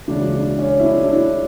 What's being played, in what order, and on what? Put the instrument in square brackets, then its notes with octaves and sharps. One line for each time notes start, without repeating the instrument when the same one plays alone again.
[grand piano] C#2 C#3 E3 D4
D4
C#4
E4
D4
D4
E4